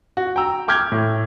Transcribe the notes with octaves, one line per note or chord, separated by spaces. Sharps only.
F#4
G5 A#5 E6
G5 D6 F6 G6 G#6
A2